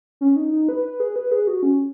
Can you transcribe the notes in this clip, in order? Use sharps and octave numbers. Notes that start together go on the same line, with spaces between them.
C#4
D#4
D#4
B4
B4
G#4
B4
G#4
F#4
C#4